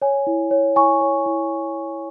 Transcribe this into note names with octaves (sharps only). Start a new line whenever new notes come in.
C#5 G#5
E4
C#5
E4 G#5 C#6
C#5
E4